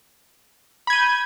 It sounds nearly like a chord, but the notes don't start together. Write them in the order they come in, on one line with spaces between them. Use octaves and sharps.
B5 G#6 D#7 G6